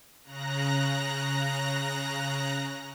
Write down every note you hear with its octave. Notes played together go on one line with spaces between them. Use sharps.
C#3 A#5 F#6 A#6